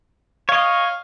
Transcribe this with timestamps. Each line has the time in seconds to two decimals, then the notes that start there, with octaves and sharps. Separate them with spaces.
0.49 C#5 D#5 F5